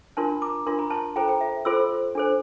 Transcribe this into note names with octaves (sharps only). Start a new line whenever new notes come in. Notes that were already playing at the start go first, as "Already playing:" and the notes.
D4 F4 A#4 A5 C6
A#5 D6
D4 F4 A#4 C6
A#5
A5 C6
F4 A4 C5 G5 A#5
G5 A#5
E5
F4 A4 C5 C6 E6
D4 A4 C5